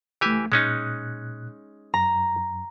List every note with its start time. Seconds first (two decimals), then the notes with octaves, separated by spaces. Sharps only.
0.21 C#2 E3 A3 G4 G#5
0.52 A#2 G#3 C#4 D#4 F#6
1.94 F#2 A#5